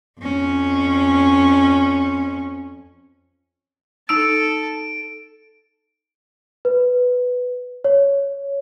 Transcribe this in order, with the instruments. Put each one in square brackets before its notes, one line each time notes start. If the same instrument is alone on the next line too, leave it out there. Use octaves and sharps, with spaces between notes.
[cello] F2 C#4
[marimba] D#4 E6 [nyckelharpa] A4 A5 [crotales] D7
[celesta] B4
C#5